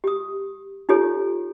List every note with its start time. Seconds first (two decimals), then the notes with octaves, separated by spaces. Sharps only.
0.04 G4 D#6
0.89 D#4 F4 G4 A4 C#5